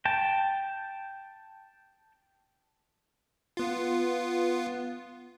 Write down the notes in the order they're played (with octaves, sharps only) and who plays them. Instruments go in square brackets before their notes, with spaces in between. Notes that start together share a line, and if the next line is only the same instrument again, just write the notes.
[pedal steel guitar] G5 A5
[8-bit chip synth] B3 F4